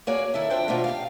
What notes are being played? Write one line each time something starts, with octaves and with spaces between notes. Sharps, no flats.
A#3 F#4 G#4 C#5 D5
D#3 E4 A4 E5
F2 D4 C5 G5
B2 A3 A#3 D4 F4
G4 F5